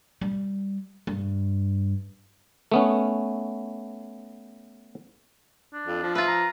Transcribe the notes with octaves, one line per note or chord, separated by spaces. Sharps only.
G3
G2
A3 B3 C#4
D4
F2
F3
F4 B4 E5
A#5